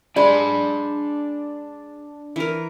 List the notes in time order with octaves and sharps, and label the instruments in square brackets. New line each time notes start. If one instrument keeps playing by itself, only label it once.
[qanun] G#3 [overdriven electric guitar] D4 B5 [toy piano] D5
[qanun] E3 A#4